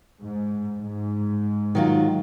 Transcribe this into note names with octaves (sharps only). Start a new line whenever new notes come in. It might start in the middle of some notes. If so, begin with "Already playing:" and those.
G#2
G#2
D#3 F#3 F4